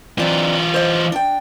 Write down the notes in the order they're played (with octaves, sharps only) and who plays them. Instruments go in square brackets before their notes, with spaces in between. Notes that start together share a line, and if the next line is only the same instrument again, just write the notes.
[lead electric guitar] E3 F4 [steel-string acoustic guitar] C4 D4 D#4
[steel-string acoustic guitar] C5 D#5
D4 G5